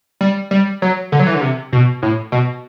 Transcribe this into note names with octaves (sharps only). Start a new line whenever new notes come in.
G3
G3
F#3
D3
F#3
E3
D3
C3
B2
A2
B2